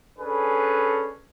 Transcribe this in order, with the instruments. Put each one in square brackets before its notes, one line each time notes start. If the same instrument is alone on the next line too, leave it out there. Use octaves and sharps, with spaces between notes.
[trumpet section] C#4 D4 G#4 A4 B4